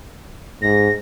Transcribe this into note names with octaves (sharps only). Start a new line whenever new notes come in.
G#2 A#6